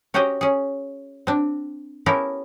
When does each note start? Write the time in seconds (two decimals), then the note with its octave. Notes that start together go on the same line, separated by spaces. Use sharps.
0.14 C#4 F#4 G4 C5 C#5 D#5
0.41 C#4 G#4
1.27 C4 D4
2.06 B3 C#4 E4 G4 A4 A#4